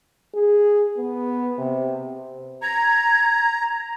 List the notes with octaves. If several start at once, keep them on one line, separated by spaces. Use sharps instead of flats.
G#4
B3
C3
A#5 G#6